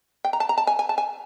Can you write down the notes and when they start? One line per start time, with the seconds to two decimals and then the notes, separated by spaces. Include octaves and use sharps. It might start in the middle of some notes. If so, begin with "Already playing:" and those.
0.25 G5
0.33 A#5
0.40 A5
0.49 A#5
0.58 A5
0.67 G#5
0.79 G#5
0.89 A5
0.98 G#5